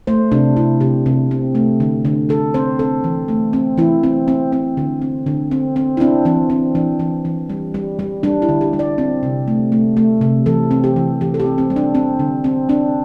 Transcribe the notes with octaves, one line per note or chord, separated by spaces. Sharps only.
A3 C5
C3 D4
C3 E4
C3 G4
C3
C4
A3
D3
D3
D3 A4
C4 C5
C4 A4
E3
A3
C4
E3 E4
C4
C4
C4
D3
C4
D3
C4
C4
E4
C4 D4
E3 C4
C4
E3 D4
E3
E3
G3
G3
G3
G3 D4
E4
D3
G4
G3
D5
C4
C3
A3
A3
A3
C3
E3 A4
C4
G4
E3
E3 G4
A4
G4
C4
C4
G3
D4
C4
D3
C4
C4 D4